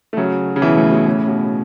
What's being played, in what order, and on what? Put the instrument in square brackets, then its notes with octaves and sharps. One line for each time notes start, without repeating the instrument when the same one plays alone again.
[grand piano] A3
C#3 F#3
C#3
B2 E3
A2
B2
A2 C#3
B2